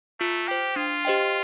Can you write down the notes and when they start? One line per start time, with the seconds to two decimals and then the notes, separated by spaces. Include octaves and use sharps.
0.20 A3 F4
0.48 G4 C5 G5
0.76 D4 F4
1.05 G4 C5 D#5 G5